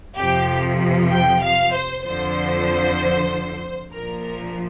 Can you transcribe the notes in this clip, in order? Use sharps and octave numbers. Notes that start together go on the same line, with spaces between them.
F2 C3 F3 G4
G5
F5
C5
F2 D3 F3 C5
A#1 A#2 F3 A#4
A#4